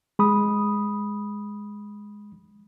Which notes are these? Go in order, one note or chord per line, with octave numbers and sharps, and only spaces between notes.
G#3 B5 D#6